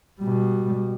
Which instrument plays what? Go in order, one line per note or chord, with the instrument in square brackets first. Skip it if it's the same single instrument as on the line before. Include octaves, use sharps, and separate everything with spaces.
[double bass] B2 G3